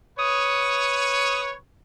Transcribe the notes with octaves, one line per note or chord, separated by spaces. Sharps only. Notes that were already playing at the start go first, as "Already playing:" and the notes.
B4 C#5 D#6